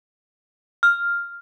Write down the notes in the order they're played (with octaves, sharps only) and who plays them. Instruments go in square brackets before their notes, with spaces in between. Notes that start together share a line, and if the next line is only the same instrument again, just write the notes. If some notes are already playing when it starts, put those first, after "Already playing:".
[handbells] F6